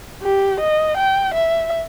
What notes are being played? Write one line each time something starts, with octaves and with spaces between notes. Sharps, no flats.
G4
D#5
G5
E5